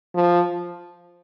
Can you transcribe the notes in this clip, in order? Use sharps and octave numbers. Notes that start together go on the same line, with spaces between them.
F3